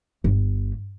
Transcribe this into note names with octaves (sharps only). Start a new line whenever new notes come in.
G1